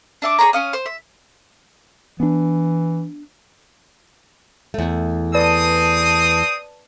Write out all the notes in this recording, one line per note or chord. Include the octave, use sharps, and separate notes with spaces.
D4 E5 D6
G#4 C5 C#5 A#5
C#4 F5 D#6
C5
E5
E3 B3 D4
E2 A3
C4 B4 D5 A5 D#6